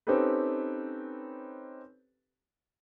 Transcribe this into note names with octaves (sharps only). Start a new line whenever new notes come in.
C4 C#4 D#4 G4 A4 B4